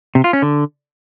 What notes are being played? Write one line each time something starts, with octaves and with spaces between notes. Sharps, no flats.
C3
F4
C#4
D3